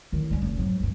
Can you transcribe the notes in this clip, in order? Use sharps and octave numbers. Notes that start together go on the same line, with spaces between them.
A2 D#3
G3 C#4
F1
G#2 F#3
G2 A#2